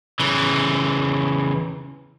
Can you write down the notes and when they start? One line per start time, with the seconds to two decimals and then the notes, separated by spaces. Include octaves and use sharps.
0.20 C#3 E3